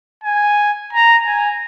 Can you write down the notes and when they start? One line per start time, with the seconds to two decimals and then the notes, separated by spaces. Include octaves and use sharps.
0.24 G#5
0.93 A#5
1.26 G#5